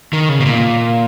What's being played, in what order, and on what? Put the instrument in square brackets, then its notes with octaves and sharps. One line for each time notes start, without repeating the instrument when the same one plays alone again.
[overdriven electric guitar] D#3
C#3
B2
A#2